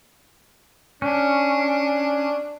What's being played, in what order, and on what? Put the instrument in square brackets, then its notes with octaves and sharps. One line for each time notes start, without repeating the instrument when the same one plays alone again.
[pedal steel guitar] C#4 [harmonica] D4